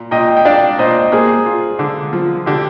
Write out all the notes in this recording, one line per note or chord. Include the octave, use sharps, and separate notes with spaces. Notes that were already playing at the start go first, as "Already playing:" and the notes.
Already playing: A#2
A#2 D#5 G5
G5
D4 D5 F5
A#2 C5 D#5
A#3 G#4 C5
F4
D3
F3
D3 G4